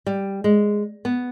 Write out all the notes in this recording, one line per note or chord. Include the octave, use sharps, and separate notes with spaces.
G3
G#3
B3